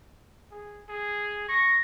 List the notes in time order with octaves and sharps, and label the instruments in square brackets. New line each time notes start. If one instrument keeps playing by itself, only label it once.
[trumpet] G#4
G#4
[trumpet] C#6 [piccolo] A#6